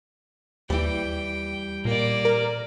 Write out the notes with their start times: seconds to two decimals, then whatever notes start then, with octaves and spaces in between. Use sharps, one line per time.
0.70 D#2 E3 G3 G5
1.85 A#2 A#3 D5
2.25 A#4